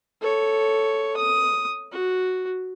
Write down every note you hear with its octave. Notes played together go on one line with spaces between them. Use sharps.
A4 C#5
D#6
F#4